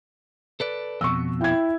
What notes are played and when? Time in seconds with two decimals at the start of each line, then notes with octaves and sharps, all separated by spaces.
0.60 A4 B4 D5
1.01 F2 B2 C#6 E6
1.41 E4 G5 G#6